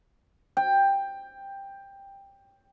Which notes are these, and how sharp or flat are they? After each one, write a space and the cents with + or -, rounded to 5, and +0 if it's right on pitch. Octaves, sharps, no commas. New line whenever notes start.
G5 +10